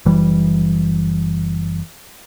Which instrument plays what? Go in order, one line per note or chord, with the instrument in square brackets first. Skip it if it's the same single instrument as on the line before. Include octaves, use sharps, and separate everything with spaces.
[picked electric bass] F#1 E3 G3